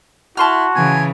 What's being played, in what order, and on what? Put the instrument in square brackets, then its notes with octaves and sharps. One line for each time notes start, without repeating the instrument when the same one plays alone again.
[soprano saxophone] E4 [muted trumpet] F#4 [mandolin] A5 C6 F6
[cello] C#3 E3 [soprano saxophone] G#5